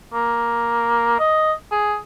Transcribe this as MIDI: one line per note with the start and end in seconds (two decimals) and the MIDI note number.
0.13 1.18 58
1.19 1.53 75
1.71 1.97 68